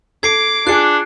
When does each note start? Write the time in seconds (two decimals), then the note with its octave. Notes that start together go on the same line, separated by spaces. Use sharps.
0.23 A4 D6 G#6 C7 D7
0.67 D4 F4 G#4 F#6 C#7